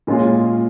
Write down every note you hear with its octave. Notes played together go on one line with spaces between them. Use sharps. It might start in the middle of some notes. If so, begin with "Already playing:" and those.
A#2 G#3 C#4 F4